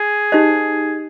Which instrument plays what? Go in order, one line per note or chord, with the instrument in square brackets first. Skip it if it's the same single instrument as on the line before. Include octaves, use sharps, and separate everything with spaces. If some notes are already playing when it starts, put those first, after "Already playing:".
Already playing: [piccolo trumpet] G#4
[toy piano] D#4 G4 C5 D#5